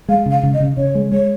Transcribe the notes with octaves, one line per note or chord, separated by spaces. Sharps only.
G#3 F5
C#3
F5
C#3
D#5
C#3
C#3 C#5
G#3
G#3 C#5